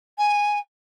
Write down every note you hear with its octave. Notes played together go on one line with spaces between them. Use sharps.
G#5